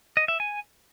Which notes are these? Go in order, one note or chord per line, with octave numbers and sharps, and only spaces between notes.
D#5
E5
G#5